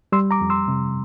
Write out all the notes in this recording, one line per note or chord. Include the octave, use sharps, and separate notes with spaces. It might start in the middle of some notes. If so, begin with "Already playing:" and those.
G3 C6 E6
A#5 D6
F2
C6 E6
C3